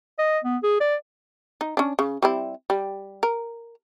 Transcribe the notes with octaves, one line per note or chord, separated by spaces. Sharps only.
D#5
B3
G#4
D5
D#4
C#4 D4
C#3
G3 C4 E4
G3
A#4